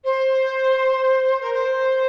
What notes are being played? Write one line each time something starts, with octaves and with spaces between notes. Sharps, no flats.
C5
A#4
C5